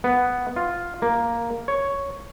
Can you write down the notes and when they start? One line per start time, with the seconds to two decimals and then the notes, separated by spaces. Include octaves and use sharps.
0.04 B3
0.56 F4
1.02 A#3
1.68 C#5